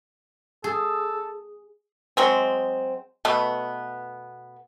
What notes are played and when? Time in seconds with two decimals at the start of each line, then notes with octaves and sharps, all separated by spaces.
0.64 G#4 A4
2.17 F#3 G#3 C4
3.25 B2 A3 B3